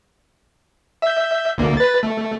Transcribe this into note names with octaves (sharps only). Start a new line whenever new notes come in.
E5 G6
D2 A#3
B4 A6
A3